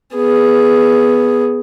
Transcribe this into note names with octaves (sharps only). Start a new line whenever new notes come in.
B3 G#4